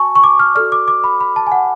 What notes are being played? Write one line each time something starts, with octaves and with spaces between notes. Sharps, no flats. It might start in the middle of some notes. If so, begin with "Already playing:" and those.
Already playing: F#4 G#5 A5 C#6
C#6
D6
F6
F#4 A4 D5 F6
D6
D6
B5
B5
A5
G#5
F#5